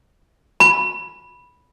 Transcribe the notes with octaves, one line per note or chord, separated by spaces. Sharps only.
B5